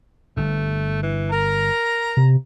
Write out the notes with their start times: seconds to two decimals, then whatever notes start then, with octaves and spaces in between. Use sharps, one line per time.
0.37 G1 G2 A3
1.03 E3
1.32 A#4 A#5
2.17 C3